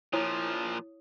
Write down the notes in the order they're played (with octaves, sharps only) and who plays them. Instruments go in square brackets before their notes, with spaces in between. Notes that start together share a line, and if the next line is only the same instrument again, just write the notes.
[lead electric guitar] A#2 F3 [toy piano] E4 C#5 D#6